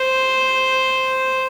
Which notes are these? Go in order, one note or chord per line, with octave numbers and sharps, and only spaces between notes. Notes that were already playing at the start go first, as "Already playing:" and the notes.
Already playing: C5